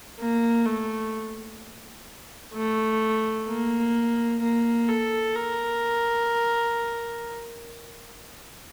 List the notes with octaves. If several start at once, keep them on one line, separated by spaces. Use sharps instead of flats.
A#3
A3
A3
A#3
A#3
A4
A#4